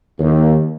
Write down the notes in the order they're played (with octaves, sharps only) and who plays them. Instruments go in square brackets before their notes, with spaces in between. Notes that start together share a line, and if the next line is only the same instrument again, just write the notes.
[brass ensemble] D#2